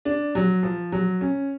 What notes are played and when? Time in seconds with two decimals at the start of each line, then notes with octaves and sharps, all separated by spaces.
0.05 D4
0.35 F#3
0.63 F3
0.92 F#3
1.21 C#4